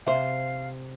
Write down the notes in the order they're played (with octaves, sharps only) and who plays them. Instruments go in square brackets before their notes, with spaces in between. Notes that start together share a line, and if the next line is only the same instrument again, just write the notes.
[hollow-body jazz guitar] C3 C5 [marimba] E5 [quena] F5